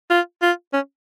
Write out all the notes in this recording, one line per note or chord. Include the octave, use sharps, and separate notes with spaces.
F4
F4
C#4